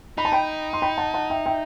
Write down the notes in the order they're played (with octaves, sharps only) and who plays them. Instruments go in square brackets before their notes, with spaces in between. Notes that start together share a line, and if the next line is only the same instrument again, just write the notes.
[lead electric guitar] D#4 [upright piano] B5
[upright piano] A5
G5 B5
C6
G5 B5
F#5 A5
F#5 A5
E5 G5
E5 G5